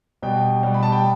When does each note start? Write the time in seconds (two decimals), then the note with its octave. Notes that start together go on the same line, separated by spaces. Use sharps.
0.22 B2 G3 G5
0.62 B2 G3
0.74 B5
0.83 A5
0.92 G5